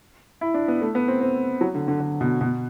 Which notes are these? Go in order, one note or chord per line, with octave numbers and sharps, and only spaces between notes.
E4
D4
B3
A3
B3
C4
C4
F#3
D3
D3
D3
B2
B2